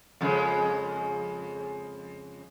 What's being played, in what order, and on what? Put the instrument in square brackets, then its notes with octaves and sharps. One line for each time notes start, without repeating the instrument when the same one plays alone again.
[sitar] F2 C#3 G#3